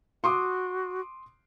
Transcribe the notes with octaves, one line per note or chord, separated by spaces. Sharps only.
F#4 C6 D6 D#6